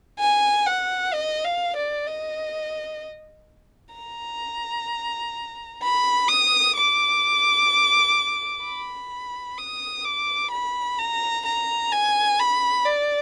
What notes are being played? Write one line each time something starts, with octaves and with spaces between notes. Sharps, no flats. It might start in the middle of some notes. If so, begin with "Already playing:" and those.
G#5
F#5
D#5
F5
D5
D#5
A#5
B5
D#6
D6
B5
D#6
D6
B5
A#5
A#5
G#5
B5
D5